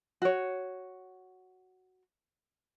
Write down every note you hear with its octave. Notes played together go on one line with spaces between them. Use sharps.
F#4 C#5